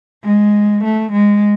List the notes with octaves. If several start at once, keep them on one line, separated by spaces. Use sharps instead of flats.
G#3
A3
G#3